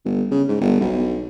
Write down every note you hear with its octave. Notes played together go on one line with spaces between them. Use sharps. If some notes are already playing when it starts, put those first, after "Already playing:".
G1
C#3
G#2
G1
B1